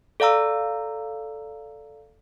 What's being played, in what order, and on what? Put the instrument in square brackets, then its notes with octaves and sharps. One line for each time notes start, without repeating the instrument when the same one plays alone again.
[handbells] A4 D5 F5 A#5 E6